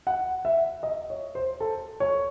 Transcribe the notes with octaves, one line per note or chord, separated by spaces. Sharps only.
F#5
E5
D#5
C#5
C5
A4
C#5